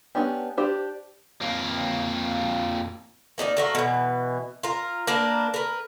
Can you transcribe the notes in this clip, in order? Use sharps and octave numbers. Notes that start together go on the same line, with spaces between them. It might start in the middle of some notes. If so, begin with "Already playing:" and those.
B3 C#4 D4 G4
D4 G4 C5
F2 A#3
A#3 D4 D#4 D5
A3 A#3 F#4
B2 E3
F4 A#4
A#3 D4 A#4 B4
A#4 B4